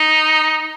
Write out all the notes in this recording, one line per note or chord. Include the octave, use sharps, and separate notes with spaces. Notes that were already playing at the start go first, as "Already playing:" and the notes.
Already playing: D#4